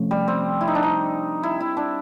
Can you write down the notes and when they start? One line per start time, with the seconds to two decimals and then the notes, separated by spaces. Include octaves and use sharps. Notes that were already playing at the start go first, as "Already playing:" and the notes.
Already playing: C3 F3 A3 C#4
0.11 G3
0.28 C4
0.61 E4
0.68 D#4
0.75 D4
0.83 D#4
1.43 E4
1.60 E4
1.77 D4